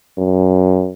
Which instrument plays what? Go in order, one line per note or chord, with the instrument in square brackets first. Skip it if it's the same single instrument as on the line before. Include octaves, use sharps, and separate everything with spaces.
[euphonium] F#2